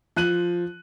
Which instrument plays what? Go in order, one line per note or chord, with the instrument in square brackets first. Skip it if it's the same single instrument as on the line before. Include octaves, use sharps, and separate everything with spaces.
[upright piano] F3 F#6 D#7 F#7